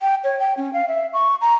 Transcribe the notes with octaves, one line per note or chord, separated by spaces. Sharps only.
G5
C#5
G5
C#4
F5
E5
C#6
A#5